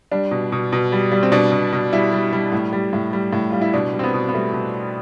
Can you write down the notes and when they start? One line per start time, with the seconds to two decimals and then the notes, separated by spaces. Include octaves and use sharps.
0.12 G3 D4
0.31 B2
0.52 B2
0.73 B2
0.92 G3
1.12 G3
1.23 C4
1.32 B2 D4
1.52 B2
1.73 B2
1.93 G3 E4
2.13 G3
2.33 G3
2.52 A2
2.73 G3
2.93 A2
3.13 G3
3.33 A2
3.50 G3 F4
3.61 E4
3.74 B2 D4
3.93 G3
3.99 C4
4.04 B3
4.14 B2
4.29 B3
4.34 G3 A3
4.53 B2